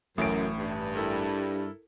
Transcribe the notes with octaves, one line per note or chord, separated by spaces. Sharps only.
A1 F#2 A2 D7
G2
E4 A4 A#4